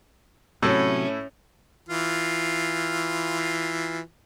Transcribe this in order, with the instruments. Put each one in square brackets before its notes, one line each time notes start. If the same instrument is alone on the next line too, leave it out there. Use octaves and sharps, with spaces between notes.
[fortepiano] A2 E4 [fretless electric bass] C3 F#3 [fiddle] C#4
[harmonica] E3 F4